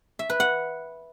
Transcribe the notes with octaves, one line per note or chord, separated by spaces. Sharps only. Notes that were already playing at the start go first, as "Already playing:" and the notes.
E5
B4
F#5